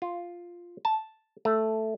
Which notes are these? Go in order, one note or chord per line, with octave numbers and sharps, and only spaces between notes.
F4
A5
A3